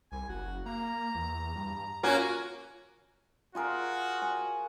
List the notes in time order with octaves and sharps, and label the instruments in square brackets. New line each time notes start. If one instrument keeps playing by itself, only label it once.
[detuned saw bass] C2 [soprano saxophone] G#5
[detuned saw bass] F#1 [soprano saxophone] F#4
[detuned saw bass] A#3 [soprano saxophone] A#5
[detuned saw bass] E2
G2
[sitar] A#3 C#4 F#4 [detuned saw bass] F4 [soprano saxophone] G#5
[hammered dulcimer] F4 G#4 A#4 [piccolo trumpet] F#4
[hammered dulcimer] G#5